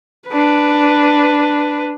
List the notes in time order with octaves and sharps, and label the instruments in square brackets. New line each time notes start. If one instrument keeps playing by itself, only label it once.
[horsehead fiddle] D4 B4